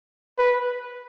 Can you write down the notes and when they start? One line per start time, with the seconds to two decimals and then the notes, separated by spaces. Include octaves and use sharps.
0.38 B4